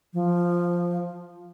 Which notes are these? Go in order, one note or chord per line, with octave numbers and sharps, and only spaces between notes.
F3